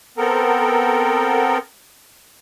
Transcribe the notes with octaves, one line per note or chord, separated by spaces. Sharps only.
B3 C4 A4 A#4